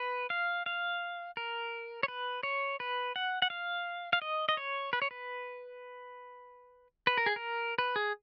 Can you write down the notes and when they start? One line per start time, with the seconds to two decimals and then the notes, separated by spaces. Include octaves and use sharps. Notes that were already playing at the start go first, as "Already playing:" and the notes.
Already playing: B4
0.30 F5
0.66 F5
1.37 A#4
2.03 C#5
2.08 B4
2.43 C#5
2.80 B4
3.16 F#5
3.42 F#5
3.50 F5
4.13 F5
4.22 D#5
4.49 D#5
4.57 C#5
4.93 B4
5.02 C#5
5.11 B4
7.07 B4
7.17 A#4
7.26 G#4
7.36 A#4
7.78 B4
7.96 G#4